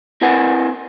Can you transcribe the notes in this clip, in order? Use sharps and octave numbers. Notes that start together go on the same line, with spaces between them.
C4 E4 A#4 B4 F#5 G#5